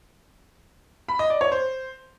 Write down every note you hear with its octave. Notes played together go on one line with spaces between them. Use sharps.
B5
D#5
D5
C#5
C5